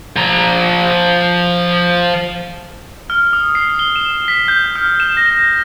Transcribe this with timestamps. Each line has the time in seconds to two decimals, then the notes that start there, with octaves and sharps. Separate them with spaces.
0.16 F3 A#5
3.10 F6
3.33 D#6
3.55 C7
3.79 G7
3.96 E7
4.28 B6
4.48 G6
4.76 F6
5.00 E7
5.17 A#6
5.30 A#6